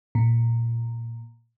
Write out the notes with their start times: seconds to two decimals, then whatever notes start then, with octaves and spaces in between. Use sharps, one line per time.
0.15 A#2